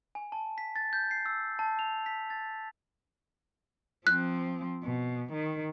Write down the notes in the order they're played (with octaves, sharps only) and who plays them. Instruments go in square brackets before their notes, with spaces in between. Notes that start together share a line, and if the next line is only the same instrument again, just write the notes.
[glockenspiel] G#5
A5
B6
A6
G6
C7
E6
A5
F7
B6
A6
[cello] F3 C4 [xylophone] F#6
[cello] B2
D#3